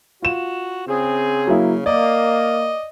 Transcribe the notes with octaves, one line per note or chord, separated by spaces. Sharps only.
F4 F#4 E7
C#3 C4 G#4
F#3 A#3 E4
A#3 D5 D#5